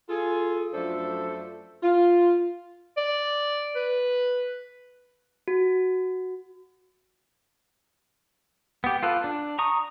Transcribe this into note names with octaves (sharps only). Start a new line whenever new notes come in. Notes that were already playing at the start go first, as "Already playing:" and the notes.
F4 G#4 A4
F#2 F3 A3 D4 A4 C5
F4
D5
B4
F#4
B3 G4
F4 A4 B4
D4
A#5 C#6 D#6